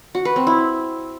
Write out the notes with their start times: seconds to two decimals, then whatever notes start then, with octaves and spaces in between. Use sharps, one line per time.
0.15 F#4
0.25 B4
0.36 C4
0.47 E4